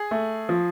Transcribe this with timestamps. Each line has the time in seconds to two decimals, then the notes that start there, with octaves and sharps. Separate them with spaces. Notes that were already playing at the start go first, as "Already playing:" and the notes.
Already playing: G#4
0.11 A3
0.49 F3